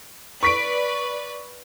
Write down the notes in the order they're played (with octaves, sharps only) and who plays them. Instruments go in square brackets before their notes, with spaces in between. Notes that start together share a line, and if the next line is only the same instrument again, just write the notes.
[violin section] B4 D5 [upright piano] C#6 B6 D7